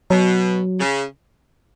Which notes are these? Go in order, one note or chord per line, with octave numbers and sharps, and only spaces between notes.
B2 F#3
C#3